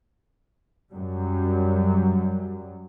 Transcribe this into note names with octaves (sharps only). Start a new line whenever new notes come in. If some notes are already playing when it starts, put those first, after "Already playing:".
F#2 F#3 G3